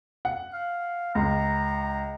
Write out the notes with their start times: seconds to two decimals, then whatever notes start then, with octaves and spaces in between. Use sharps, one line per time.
0.25 F#5
0.53 F5
1.15 C#2 A#5